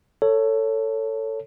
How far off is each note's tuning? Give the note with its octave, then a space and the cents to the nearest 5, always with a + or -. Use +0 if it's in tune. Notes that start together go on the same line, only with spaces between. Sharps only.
A4 +20 C#5 +0